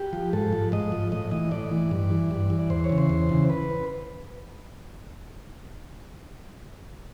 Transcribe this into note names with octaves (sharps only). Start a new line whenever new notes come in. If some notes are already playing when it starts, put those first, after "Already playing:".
Already playing: G4
F3
G#2 A4
F3
G#2 D#5
F3
A2 D#5
E3 D#5
A2 D5
E3
G2
E3
G2
E3
E2 C5
C#5
C#3 E3
C5
E2
C#3 E3
B4